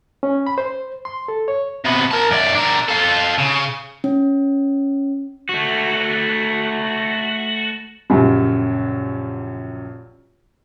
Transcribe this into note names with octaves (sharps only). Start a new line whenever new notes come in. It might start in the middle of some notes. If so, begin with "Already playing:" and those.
C#4
B5
C5
C6
A4
C#5
C3 B3
A#4 A5
F#2 D5
D4 A#4
F4 A4
C#3
C#4
A3 F#4
A#1 F#2 C#3 F#3 G4